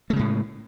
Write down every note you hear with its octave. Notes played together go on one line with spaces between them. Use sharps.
A2 C#3 G#3 A3